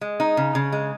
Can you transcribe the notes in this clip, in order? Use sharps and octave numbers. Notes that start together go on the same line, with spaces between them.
G#3
D#4
C#3
C#3
G#3